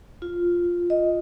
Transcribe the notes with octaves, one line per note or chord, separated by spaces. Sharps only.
F4
D#5